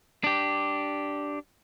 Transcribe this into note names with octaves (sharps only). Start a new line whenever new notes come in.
D4 G4